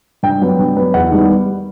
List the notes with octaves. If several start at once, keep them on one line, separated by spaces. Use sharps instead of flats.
G2 G5
F#3 B3
G2
F#3 B3
E2 F#5
D#3 G3 B3